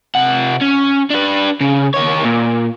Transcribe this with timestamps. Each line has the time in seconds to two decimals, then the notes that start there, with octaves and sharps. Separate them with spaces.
0.15 C3 F#5
0.62 C#4
1.10 D4 B4
1.61 C#3
1.94 D#2 C#5
2.25 A#2